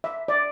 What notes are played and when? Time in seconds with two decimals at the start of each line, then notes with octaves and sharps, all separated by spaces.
0.04 E5
0.28 D5